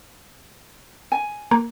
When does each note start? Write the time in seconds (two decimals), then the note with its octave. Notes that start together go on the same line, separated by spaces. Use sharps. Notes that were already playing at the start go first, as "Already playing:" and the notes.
1.12 G#5
1.51 A#3